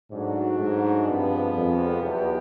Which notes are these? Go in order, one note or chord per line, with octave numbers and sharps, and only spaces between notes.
G#2 F#3 A3 D4 F#4
G#2
G2 C3 F3 G#3 B3
F2
E2 F#3 B3 D#4 G4